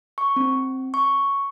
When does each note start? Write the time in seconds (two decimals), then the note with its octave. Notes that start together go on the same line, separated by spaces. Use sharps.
0.18 C#6
0.36 C4
0.94 C#6